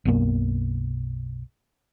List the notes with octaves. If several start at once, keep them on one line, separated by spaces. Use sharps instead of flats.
B1 F#2 B2 A#3